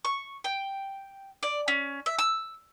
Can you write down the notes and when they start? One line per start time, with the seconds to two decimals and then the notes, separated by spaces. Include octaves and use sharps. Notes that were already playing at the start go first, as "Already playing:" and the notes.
0.05 C#6
0.44 G5
1.43 D5
1.68 C#4
2.06 E5
2.19 E6